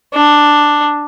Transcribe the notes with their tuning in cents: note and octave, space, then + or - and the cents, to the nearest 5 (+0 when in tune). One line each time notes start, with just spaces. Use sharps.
D4 +5